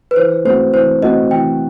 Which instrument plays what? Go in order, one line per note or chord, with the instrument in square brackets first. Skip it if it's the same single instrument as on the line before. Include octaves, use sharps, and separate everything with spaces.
[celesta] B4
[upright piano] E3 [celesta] C5
[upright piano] A3 C4 F#4 [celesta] C5
[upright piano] E3 [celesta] C5
[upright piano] A3 C4 F#4 [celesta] D#5
[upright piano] E3 [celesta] G5